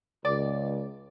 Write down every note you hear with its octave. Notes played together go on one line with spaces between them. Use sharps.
C#2 D5